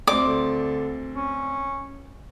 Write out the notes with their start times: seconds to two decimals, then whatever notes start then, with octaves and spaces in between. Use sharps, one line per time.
0.07 D2 C4 D5 D6
0.23 D3
1.16 C#4